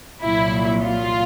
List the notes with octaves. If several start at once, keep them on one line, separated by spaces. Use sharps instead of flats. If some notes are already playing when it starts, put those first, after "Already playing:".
C2 A#2 F#3 E4
F4